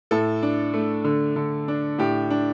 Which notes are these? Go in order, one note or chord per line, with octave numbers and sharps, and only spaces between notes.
A2 A4
D4
A3
D3
D3
D4
A2 G4
D4